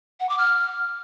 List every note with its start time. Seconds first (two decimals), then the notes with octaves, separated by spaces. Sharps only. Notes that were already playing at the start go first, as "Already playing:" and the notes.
0.20 F#5
0.29 D6
0.38 F6